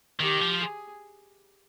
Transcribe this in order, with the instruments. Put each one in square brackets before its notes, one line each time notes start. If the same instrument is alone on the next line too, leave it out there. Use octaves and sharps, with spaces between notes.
[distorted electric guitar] D#3 [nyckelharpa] G4
[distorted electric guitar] F3
[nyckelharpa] G#4